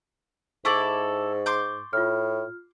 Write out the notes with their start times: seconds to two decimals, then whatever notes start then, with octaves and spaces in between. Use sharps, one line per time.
0.65 G#2 E4 A4 C#6 D6 A6 F#7
1.46 C6 D6 G6
1.93 A2 F4 F6